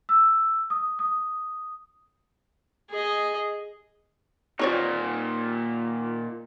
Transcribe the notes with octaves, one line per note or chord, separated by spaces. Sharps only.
E6
D#6
D#6
G#4 D#5
A#2 C4 D#4 F4 C#5 D5